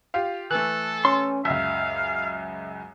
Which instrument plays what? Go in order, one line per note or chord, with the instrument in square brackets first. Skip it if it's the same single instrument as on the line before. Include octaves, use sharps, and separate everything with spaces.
[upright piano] F4 G4 F5
[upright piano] E3 A3 [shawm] A4 [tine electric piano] F#6
[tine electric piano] C#4 [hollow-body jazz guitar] C6
[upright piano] C#2 F#2 [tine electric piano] E5 [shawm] F5